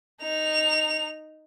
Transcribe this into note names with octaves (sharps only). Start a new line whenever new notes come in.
D#4 F7